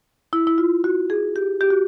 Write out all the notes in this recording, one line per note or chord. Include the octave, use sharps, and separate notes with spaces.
E4
E4
F4
F#4
G#4
G4
G4
F#4